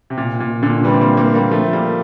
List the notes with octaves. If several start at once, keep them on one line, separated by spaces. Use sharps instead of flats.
C3
A#2
A#2
A#2 D3
E3 G3
C4
G3 A#3
G3 A#3
G3 A#3
F3 A3
G3 A#3